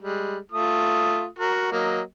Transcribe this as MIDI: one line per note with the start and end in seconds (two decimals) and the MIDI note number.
0.02 0.37 55
0.02 0.37 56
0.52 1.25 57
0.52 1.25 65
0.52 1.25 87
1.39 1.68 66
1.39 1.68 70
1.72 2.01 54
1.72 2.01 58
1.72 2.01 75